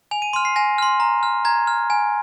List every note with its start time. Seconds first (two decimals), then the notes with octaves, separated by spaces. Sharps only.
0.11 G#5 F7
0.22 D#7
0.33 C6 F6 D#7
0.45 C7
0.56 G#5 A#6
0.78 C6 F6
1.00 A#5
1.23 F6
1.45 A#5 G#6
1.67 F6
1.90 G#5